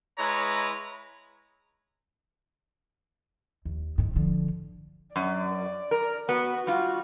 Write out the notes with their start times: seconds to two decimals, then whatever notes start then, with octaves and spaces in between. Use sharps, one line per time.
0.18 G#3 E4 B4 C#5 A#5
3.65 D#2
3.98 G#2 D#3
4.16 D3 F3
5.16 F#2 D5
5.91 A#4
6.29 B3 F#4
6.67 G3 F4 F#4